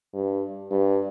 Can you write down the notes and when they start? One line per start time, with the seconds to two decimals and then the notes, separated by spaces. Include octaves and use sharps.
0.14 G2
0.71 G2